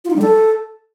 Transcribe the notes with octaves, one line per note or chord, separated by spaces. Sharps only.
F4
D#4
G3
A4